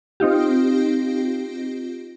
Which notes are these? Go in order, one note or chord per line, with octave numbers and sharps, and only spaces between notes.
C4 D#4 F4 G4